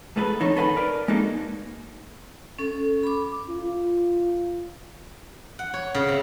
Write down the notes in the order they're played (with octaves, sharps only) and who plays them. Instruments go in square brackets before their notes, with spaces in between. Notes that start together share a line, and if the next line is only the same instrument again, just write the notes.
[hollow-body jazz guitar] G#2 A3 G#4 A4 B4
F2 D#3 D#4 A4 C#5
A4 B4 D#5 F#5 G#5 B5
A#4 B4 D5
G#3 A#3 D#4 F#4 A4
[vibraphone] C#4 A4
B5 D6
[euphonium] F4
[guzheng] F#5
C#5
C#3
C3